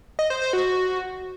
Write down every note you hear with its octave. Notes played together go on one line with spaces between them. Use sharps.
D#5
C5
C5
F#4